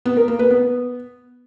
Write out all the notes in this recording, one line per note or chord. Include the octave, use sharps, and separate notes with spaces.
B3
A#4
A#3
B4
B3